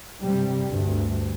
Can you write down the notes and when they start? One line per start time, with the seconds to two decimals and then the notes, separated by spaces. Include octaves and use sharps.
0.22 G2 C3 G3
0.64 D2 G2